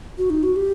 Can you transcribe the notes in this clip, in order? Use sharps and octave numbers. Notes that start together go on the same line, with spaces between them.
F#4
D#4
F#4
G4